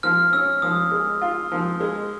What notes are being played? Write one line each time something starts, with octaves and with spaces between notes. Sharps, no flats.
F3 F6
C#4 E6
F3 D#6
G#3
F4
F3
G#3